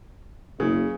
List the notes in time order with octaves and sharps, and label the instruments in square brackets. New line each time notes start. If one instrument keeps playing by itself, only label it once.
[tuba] F#1 [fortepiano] C#3